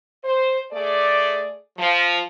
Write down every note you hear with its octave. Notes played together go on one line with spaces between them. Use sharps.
C5
A3 G#4 D5
F3